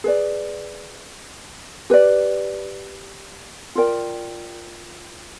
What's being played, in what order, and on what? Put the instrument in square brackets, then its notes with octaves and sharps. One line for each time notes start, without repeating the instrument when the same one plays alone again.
[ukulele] G#4 B4 D5
G4 B4 D5
F4 A#4 D5 G5